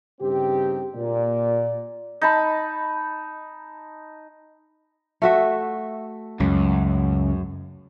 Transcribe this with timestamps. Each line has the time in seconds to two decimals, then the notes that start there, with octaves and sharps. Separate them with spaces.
0.20 G2 C#3 C4 D#4 G4
0.95 A#2 D5
2.21 D#4 A5 B5
5.22 A3 F#4 E5
6.40 C#2 F#2